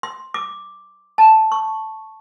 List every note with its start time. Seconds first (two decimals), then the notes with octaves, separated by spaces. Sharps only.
0.03 C6
0.34 D6
1.18 A5
1.52 C#6